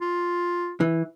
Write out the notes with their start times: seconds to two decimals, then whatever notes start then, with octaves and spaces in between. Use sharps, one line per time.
0.01 F4
0.81 E3